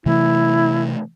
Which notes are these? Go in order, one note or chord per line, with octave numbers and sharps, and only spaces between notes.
C3 E3 A3 E4